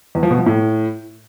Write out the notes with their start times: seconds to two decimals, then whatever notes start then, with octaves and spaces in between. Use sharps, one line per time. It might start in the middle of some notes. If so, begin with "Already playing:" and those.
0.15 E2
0.23 F3
0.31 B2
0.38 F3
0.46 A2